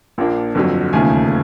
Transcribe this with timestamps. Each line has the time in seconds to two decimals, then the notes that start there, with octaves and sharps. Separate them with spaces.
0.18 A#1 A#2 F3 A#3 D4
0.55 G1 F2 D3 F#3
0.93 E1 D#2 C#3 F3 A3 G#5